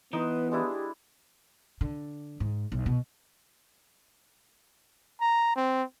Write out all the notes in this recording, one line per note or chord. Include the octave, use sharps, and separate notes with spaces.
E3 B3 D#4 B4 D#5 C6
G#3 D4 E4 G4
D3
G#2
B1
B2
A#5
C4